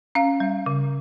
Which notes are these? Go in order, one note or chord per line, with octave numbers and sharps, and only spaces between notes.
C#4 F5
G3
C#3